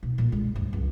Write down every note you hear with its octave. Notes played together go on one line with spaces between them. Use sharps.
B1
F2 A#2
D3 G#3
D2 G2
C#2 F#3